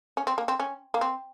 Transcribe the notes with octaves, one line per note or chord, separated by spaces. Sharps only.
C#4
C4
A#3
C4
C#4
A#3
C4